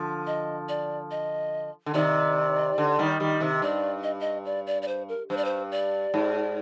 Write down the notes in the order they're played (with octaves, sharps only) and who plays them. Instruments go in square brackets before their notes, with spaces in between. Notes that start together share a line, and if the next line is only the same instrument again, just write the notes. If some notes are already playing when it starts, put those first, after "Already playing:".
Already playing: [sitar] D3 F3
[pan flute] D#5
D5
D#5
[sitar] D3
[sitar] C3 D#3 [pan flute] D5
[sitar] D3
D#3 G3
D#3 G3
C3 D#3
[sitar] G2 [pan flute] D5
[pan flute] D#5
D#5
D5
D5
D5
C5
A#4
[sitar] G2 [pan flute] C5
[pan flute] D5
C5
D5
[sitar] G#2